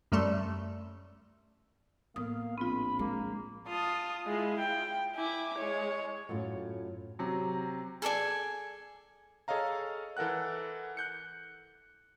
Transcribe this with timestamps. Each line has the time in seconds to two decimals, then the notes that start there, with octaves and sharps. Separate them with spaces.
0.12 F#2 G3 A3 A5 C6
2.16 A2 A#3 B3 F5 D#6
2.58 A#1 C4 F4 B5
2.99 G#3 A#3
3.68 F4 A5 D#6
4.27 G#3 E4 F4
4.59 G5
5.16 E4 G#5 D6
5.58 G#3 C#5
6.29 F#2 A2 F4
7.19 C3 F#3
8.02 G#4 A4 D5 G#5
9.48 G#4 A4 C#5 D#5 F5 A#5
10.17 E3 A4 A#4 F#5 F#6
10.97 F#6 G6 C#7